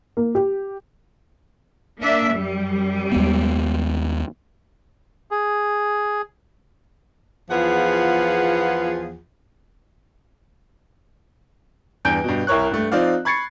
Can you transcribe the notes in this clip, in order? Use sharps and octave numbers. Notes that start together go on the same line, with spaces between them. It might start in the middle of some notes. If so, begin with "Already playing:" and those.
A#3
G4
A#3 D4 E5
F#2 G3
D#2 G#3 B3
G#4
E2 F3 B3 F4 G#4 F#5
E2 G2 G#5 G6 D7
G2 B2
C2 E4 A#4 C#5 C#6 F#6
G2 A3
F3 C4 D#4 D5 F5
B5 C#6 G#6 A6 C7 C#7